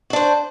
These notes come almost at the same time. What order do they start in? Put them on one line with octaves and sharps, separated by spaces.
F#4 D4 C5